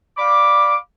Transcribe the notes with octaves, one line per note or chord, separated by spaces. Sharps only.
D5 F5 B5 D6